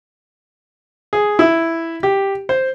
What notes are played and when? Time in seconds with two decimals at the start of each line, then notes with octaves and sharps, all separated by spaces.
1.13 G#4
1.39 E4
2.03 G4
2.49 C5